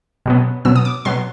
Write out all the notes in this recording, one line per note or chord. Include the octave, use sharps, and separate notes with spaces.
B2 F#3 B3
B2 F#3 B3 E6
D#6
D6
B2 F#3 B3 C6